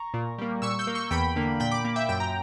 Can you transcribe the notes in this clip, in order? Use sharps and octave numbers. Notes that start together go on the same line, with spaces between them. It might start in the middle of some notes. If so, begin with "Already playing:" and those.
Already playing: A#5 C#6
A#2
G3 A#3
A#2 C#6 E6
E6 G6
A#3
C#6 E6
E2 G5 B5
D3 A#3
A#2 G5 B5
B5 D6
A#3
E5 G5
F#2 G5
A#5